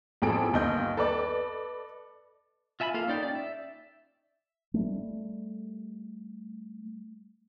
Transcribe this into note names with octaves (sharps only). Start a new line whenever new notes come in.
A1 F2 G#4 A4 D7
G1 D#2 D#5 G6
A4 B4 D5 D#5
F4 E5 G#5 A5 B5
A#3 F4 A4 F5
C#4 D#4 D5 G5
D5
E5
G3 A3